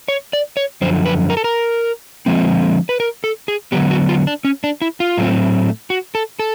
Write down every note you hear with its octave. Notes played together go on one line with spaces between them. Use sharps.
C#5
D5
C#5
F#2 D3 F3 C5
B4
A#4
A4
A#4
D3 F3 G#3 C4
B4
A#4
A4
G#4
D3 F#3 B3 G4
F#4
F4
D4
C#4
D4
E4
F4
A2 F#3 A3 C4
F#4
A4
A4